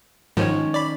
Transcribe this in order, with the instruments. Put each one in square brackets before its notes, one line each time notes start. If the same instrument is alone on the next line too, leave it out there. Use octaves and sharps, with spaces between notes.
[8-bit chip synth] G#2 F3 [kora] D#3 C#4 C#5
[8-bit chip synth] D5 B5